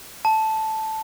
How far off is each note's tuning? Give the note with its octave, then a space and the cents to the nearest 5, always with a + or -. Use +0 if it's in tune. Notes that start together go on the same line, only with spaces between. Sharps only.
A5 -5